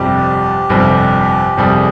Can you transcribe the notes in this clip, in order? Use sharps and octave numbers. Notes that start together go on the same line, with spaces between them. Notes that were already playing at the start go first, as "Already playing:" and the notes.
Already playing: G1 F2 C3 G3 G4
G1 F2 C3 G3
G1 F2 C3 G3 G#4